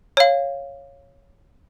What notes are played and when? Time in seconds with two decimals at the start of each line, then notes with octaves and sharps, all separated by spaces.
0.17 C#5 F5